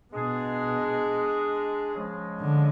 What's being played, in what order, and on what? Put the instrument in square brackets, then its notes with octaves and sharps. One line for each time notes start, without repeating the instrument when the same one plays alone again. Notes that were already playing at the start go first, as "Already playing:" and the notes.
[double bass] B2 [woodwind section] G#3 D4 G#4
[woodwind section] C#3 F3 G#3
[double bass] D3